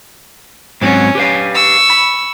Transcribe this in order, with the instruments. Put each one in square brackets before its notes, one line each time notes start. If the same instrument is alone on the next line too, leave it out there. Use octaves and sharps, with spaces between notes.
[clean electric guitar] G#2 F#3 C4 [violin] C#4
[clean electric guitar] G4 B4 F5
[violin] C#6 E6
[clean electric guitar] B5